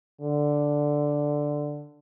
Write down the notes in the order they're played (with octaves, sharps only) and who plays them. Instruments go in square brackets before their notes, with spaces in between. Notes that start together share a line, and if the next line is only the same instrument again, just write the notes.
[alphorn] D3